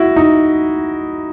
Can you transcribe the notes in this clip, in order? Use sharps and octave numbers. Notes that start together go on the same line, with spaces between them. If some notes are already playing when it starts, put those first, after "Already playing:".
Already playing: E4 F#4
D#4